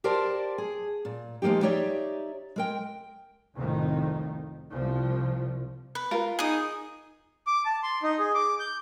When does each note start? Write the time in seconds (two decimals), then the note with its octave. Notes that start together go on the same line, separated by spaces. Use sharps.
0.04 G4 A#4 C5 D5 A5
0.58 G#4
1.05 A#2
1.42 F3 G#3 A#3 D#4 G4
1.63 D#4 G4 C#5 D5 E5
2.56 G#3 A#4 G5
3.55 C2 F2 A2 D#3
4.71 C2 F3
5.95 B4
6.11 F4 A#4
6.39 D#4 G#4 D#6
7.47 D6
7.65 A5
7.83 C6
8.03 D#4
8.19 G#4
8.35 D6
8.60 G6